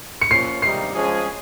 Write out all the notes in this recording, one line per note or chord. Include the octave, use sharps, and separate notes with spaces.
C#7
F3 A#3 C#4 F4 C7
C3 D#3 G3 A#3 D#4 C7
F3 G#3 C#4 G#4